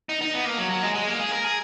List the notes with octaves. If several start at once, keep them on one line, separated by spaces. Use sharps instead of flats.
D#4
D#4
B3
A#3
F#3
F#3
G#3
G#3
A#3
G#4
A#4
G#4